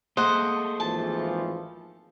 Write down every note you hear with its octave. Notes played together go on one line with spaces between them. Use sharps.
A3 A#3 G#4 C5 D#5 F#5
G#1 E3 F3 A5